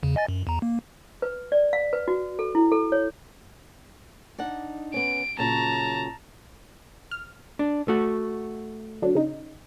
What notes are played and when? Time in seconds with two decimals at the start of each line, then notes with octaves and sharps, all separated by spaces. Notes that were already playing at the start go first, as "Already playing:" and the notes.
0.03 E2 C#3
0.16 D#5 G#5 A6
0.29 F#2
0.47 E2 A#5
0.62 A#3
1.22 B4
1.52 D5
1.73 F5
1.93 B4
2.08 F#4
2.39 A4
2.55 E4
2.72 A4
2.92 C#5
4.38 D4 D#4 F#5
4.94 B3 C#4 D7
5.38 A#2 C#3 F#3 A5 A#5
7.11 F6
7.59 D4
7.88 A3 F#4
9.02 D3 F#3 D4
9.15 C#3 D#4